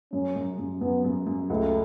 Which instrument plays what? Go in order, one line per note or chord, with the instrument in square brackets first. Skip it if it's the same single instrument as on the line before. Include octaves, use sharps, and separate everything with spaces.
[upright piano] F#2 [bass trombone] C#4
[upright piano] F#2
F#2
[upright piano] F#2 [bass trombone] B3
[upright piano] F#2
F#2
[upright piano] C#2 [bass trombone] A3